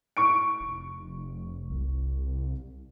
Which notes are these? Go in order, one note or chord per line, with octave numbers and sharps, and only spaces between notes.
C#6 D7
F1
C2